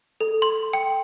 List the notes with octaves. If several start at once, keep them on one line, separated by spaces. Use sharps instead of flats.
A4
C6
G5